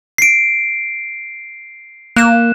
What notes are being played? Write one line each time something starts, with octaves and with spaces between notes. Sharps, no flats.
C7 D7
A#3 F#6 E7